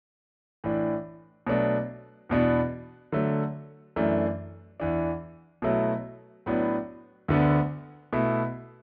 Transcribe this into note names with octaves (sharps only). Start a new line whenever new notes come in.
A2 E3 D4
B2 F#3 A3 D4
E2 B2 B3 D4
D3 F#3 A3
F#2 E3 A3 D4
E2 E3 D4
B2 F#3 A3 E4
A2 F#3 B3 D4
D2 D3 B3 D4
B2 A3 E4